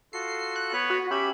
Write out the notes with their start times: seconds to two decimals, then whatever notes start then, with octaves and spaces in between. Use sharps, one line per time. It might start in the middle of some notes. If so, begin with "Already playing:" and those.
0.13 F4 F#4 A4 C7
0.56 F#6
0.73 B3 B4 C#5
0.90 F#4
1.11 C#4 G4 E5 B5